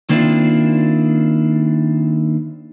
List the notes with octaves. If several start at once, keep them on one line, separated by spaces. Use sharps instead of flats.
D#3 A#3 C4 D4 E4 F4